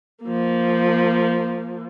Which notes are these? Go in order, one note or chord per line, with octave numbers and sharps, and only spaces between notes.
F3 A#3